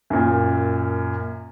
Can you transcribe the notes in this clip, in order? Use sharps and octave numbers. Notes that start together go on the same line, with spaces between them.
F#2 A#2